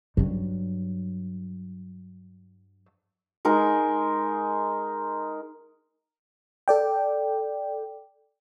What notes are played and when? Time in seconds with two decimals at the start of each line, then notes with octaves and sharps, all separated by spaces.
0.17 G2 F#3
3.45 G#3 D#4 A#4
6.68 A4 D5 G5